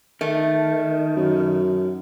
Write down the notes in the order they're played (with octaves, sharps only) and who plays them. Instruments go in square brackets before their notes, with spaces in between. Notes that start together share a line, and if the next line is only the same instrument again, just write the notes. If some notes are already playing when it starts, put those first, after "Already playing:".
[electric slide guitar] D#3 [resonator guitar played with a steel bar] A3
[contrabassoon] F#2